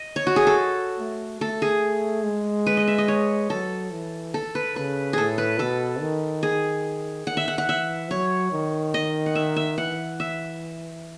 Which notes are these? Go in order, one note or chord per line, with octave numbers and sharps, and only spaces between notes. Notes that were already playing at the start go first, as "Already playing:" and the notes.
Already playing: D#5
C#5
F#4
G#4
A4
A3
A3 A4
G#4
G#3
B4
D#5
E5
D#5
C#5
F#3 A4
E3
A4
B4
C#3 B4
A2 G#4 A4
B4
B2 A4
D#3
G#4
D#3 F#5
E5
F#5
F#5
E3 E5
F#3 C#5
D#3
D#5
F#5
E5
E5
E3 F#5
E5